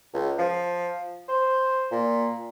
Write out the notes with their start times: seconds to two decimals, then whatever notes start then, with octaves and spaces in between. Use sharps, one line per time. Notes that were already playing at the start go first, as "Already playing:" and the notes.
0.13 C#2
0.38 F3
1.28 C5
1.91 A#2